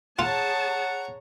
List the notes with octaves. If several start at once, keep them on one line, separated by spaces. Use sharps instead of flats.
F4 G#4 C#5 F#5 A5 A#5